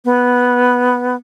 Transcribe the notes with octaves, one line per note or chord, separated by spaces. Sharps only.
B3